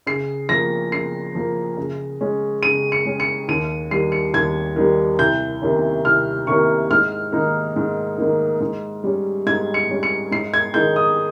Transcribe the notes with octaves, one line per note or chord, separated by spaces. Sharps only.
C#3 C7
F3 A#3 A#6
C#3 C7
F3 A#3
C#3
G#3 C#4
C#3 D#7
C#7
G#3 C#4
C#7
D#2 D#7
D#3 G3 C7
C#7
D#2 G#6
D#3 G3
C2 G6
C3 D#3 A#3 C#4
C2 F6
C3 D#3 A#3 C#4 C#6
G#2 F6
D#3 A#3 D#4
G#2
D#3 A#3 D#4
G#2
G3 C#4
G#2 G#6
C#7
G3 C#4
C#7
G#2 C7
G#6
D#3 G#3 D#4 G6
D#6